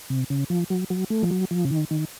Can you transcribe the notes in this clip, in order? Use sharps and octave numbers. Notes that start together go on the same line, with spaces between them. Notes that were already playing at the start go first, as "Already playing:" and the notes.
C3
C#3
F3
F#3
F#3
A3
F3
F#3
F3
C#3
D#3
D#3